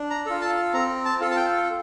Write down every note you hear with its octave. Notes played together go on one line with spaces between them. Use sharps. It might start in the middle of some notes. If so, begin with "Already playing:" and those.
Already playing: D4
A#5
F4 A4
A5
C4 A#5
A5
F4 A4
A5
G5